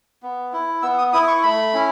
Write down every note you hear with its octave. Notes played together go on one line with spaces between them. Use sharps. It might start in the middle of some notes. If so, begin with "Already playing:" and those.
B3
E4
B3 E6
D#6
E4 D#6
C#6
A3 B5
C#4 E4